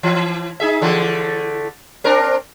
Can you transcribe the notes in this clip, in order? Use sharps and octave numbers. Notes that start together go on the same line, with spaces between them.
E3
D#4 G#4 E5
D3 E3 A3
C4 D4 A#4